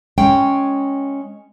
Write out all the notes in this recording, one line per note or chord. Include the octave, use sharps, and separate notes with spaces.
G#3 C#4 G5